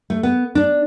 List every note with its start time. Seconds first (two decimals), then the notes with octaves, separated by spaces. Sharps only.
0.10 A3
0.23 B3
0.55 D4